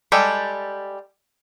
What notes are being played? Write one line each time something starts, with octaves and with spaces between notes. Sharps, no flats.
G3 G#3 G4 A4